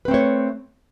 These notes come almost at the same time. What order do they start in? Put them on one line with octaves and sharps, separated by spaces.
B4 C4 A3 C#5